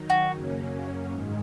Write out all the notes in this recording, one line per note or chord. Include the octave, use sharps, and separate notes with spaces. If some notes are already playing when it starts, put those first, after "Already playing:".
Already playing: D#3 F#3 D#4
F#4
F#2 C#3 F#3 A#3 C#4
G#2 D#3 G#3